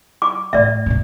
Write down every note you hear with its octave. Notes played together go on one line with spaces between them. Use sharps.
D6
A2 D5 E5
G2 A#2